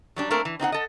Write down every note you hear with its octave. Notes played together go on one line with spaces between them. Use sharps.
F#3 G3 D4
A3 A#3 C4 A#4
E3
C4 D#4 F#4 F#5
A4 D#5